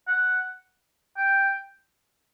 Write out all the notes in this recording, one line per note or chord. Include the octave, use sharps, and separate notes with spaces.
F#5
G5